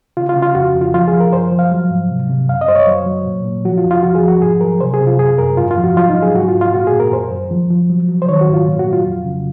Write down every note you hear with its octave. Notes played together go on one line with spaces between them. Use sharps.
C#3 F4
F4
C#3
F4
F2 F#4
F2
F4
F3 F4
G#4
F3
A#4
F#2 C5
F3
F5
F#3
G#2
C3
C3
F#2 F5
D#5
F#2 C5
C#5
F#3
F#3
A#2
A#2
F3 F#4
F4
F2
F4
F3 F#4
G#4
F3
F#4
G#2 G#4
F#3 A#4
C3 C5
G#4
C3
F4
F#2 G#4
F#2 A#4
G#2 F4
F4
F3
F#4
F#3 F4
D#4
F#3
G#4
G#2 F#4
F4
G#2
F4
A#2 F#4
G#4
A#2
A#4
F#2 C5
F#2
F3
F3
F#3
F#3
C5
D#3 C#5
F#4
G#2
F4
A#2
F#4
F#3
F4
F2
C#3